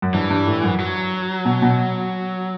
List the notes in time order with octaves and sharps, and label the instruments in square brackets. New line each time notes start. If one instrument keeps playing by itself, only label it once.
[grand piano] F#2
[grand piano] G2 [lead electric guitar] E3
[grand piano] G2
A2
F#2
[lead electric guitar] F#3
[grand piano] B2
B2